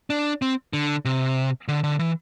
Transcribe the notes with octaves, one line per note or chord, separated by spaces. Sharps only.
D4
C4
D3
C3
D3
D3
E3